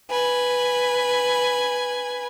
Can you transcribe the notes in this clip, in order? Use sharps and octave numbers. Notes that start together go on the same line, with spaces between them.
B4 G#5